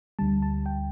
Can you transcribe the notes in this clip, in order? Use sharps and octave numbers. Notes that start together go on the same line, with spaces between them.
D2 D3 G3 A5
A5
G5